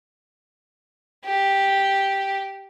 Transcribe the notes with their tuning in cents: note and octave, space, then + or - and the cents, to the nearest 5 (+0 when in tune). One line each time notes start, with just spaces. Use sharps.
G4 +0